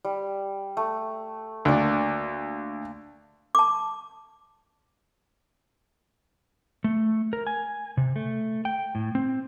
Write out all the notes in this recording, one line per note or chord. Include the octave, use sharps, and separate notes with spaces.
G3
A3
D2 A#3 D5
A5 D6
A3
A#4
G#5
C3
A3
G5
A2
C4